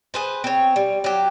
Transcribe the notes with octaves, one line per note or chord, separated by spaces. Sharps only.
G#4 B4 C5
C4 C#5
G3
F#3 G4